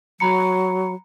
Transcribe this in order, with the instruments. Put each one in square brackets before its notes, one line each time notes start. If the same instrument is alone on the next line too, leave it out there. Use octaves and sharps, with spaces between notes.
[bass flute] F#3 [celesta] A#5 B5 C#7